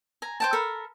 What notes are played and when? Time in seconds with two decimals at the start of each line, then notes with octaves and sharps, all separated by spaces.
0.22 G#5 A#5
0.40 C5 G5 A5
0.53 A4 A#4 B5